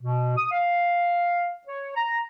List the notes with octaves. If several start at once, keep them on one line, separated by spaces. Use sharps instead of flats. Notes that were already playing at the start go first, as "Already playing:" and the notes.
B2
D#6
F5
C#5
A#5